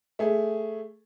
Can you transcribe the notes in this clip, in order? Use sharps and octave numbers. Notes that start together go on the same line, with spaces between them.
A3 G#4